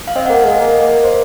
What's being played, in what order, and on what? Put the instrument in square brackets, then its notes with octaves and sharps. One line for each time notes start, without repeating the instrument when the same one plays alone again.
[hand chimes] F5
[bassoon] C4 [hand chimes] D#5
[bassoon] A#3 [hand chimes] F#5
[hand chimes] F5
[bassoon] G#3 [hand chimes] D#5
[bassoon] A#3
A#3
[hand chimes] C5